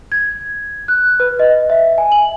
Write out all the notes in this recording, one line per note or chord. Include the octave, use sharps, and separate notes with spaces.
G#6
F#6
B4
D#5
E5
G#5
F#7